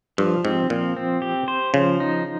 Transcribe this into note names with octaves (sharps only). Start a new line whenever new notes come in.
G2 F3
G#2 C4
A#2 F3
C4
G4
C5
C#3 F3
D#4